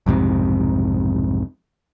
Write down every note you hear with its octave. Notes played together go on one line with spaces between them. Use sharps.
B1 F2 G#2 C3